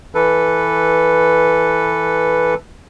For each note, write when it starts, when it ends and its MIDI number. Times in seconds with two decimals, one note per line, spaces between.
0.15 2.54 52
0.15 2.54 69
0.15 2.54 71